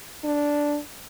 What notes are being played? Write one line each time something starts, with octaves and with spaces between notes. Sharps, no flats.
D4